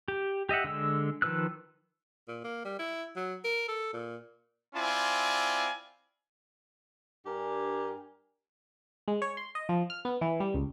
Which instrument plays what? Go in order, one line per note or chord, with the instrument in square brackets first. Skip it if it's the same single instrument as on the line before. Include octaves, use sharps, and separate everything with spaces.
[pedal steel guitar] G4
G4 D#5 E5 F#5
D3 G#3 E6
D#3 F3 B4 E6 F#6
[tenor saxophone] A#2
A#3
G3
E4
F#3
A#4
A4
A#2
[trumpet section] C4 E4 F4 D5 G#5
[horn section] G2 D4 G4 A#4 G#5
[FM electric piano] G#3
C#5
C6
D#5
F3
F6
B3
E3
G3
C#2